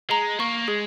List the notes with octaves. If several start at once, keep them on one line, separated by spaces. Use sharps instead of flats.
G#3 A#5
A#3 C#6
G#3 G#4